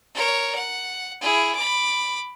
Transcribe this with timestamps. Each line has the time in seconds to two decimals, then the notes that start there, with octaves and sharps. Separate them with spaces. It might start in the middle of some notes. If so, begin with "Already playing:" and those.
0.14 A#4 C#5
0.55 F#5
1.21 E4 G#4
1.55 B5 D6